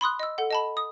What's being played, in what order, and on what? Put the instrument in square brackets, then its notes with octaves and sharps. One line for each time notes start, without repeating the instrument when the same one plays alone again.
[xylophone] B5 C6 D#6 F#6
D#5 E6
A4 F#5
D#5 A5 B5
D#6